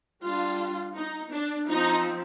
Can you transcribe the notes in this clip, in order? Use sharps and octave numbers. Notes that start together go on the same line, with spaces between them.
G3 D4 F4
D#4
D4
F3 C4 D#4